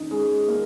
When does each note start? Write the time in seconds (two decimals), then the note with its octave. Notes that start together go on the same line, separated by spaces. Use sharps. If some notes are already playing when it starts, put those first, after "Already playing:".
Already playing: D#2 D#3 C#4 D#4
0.11 G#3
0.48 A#3